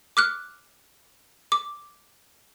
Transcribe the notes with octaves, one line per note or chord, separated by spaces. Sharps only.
D6 F6 F#6
D6